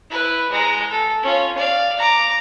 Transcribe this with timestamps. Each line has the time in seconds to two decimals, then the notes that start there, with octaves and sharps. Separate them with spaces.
0.10 E4 B4
0.51 G#3 A#5
0.90 A4
1.22 C#4 F4
1.57 D5 F5
1.98 A#5 D6